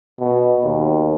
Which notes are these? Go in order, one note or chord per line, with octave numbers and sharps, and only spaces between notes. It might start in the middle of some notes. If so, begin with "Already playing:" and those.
B2
D#2